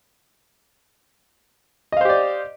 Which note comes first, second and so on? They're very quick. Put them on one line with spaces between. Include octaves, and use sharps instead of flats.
D#5 F5 C5 G4 D5